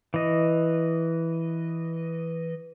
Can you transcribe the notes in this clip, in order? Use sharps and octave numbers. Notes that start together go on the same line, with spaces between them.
E3 D#5